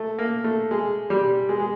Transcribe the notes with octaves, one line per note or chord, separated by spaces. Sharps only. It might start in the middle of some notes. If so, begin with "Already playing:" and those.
Already playing: A3
A#3
A3
G#3
G3
G#3
G#3